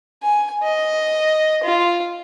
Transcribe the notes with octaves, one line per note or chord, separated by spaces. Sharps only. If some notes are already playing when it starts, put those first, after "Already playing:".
G#5
D#5
F4